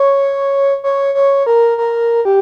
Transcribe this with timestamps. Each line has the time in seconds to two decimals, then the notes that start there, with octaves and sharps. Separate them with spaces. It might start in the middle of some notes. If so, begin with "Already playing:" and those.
Already playing: C#5
0.84 C#5
1.15 C#5
1.46 A#4
1.78 A#4
2.25 G4